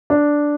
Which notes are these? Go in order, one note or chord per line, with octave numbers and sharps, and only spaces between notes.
D4